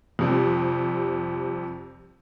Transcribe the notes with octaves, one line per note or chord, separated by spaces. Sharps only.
F2 C3 G3